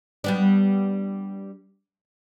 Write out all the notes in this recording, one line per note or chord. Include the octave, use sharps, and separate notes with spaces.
G3 B3 D4